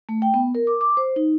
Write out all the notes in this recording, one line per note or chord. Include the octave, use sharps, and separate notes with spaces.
A3
G5
B3
A#4
D6
D6
C5
D#4